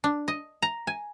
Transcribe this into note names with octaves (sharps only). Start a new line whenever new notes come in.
D4
D#5
A#5
G#5